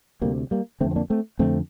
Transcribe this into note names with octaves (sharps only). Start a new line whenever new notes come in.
D2 C3 G3 A#3
G3 A#3
F2 D3 A3 C4
C4
A#3 D4
A3 C4
F2 D3 A3 C4